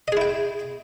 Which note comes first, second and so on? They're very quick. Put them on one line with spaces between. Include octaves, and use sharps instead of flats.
D#5 G#4 E4 G5